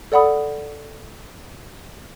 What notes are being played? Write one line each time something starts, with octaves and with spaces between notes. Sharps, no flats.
A4 D5 F#5 B5 D#6